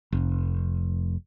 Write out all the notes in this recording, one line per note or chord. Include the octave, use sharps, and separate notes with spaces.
F1